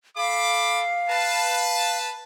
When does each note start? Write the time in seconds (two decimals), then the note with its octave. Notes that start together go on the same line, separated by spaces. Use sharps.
0.17 A4 F5 B5 D6
1.10 B4 A5